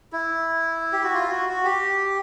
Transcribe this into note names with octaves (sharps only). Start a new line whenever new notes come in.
E4
G4
F#4
F4
F#4
F#4
G4